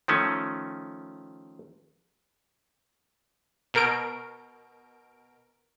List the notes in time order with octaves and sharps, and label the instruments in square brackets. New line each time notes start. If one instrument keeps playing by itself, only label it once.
[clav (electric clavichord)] D#3 F3 A3 C#4
[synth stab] B2 A#4 D7